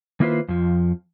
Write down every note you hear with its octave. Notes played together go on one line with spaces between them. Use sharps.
D#3 A#3 E4 F4 B4 C5
F2 F3